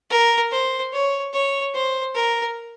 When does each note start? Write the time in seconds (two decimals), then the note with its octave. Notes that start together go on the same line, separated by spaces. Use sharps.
0.10 A#4
0.52 C5
0.92 C#5
1.33 C#5
1.74 C5
2.15 A#4